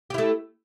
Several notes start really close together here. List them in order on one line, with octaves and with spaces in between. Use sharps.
G4 E4 A3